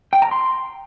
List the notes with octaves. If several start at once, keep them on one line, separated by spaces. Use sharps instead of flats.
G5
A#5
C6